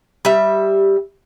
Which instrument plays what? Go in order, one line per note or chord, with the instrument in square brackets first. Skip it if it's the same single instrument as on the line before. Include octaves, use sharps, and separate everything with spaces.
[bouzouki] G3 E5